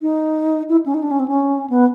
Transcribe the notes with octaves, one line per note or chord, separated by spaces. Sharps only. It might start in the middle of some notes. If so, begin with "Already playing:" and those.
D#4
E4
C#4
D#4
D4
C#4
C4
C#4
B3